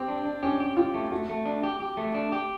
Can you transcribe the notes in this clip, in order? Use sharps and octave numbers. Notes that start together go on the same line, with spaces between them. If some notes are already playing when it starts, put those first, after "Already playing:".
Already playing: C4 G4
D4
D4
C#4 G4
G4
F4 G4
A3
A3 F#4
A3
D4
G4
G4
A3
D4
G4